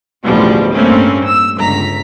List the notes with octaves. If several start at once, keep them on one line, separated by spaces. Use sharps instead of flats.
A1 D2 B2 F3 G3 G#3
G2 G3 A3 A#3 C4 C#4
E6
G1 C#2 A#5 B6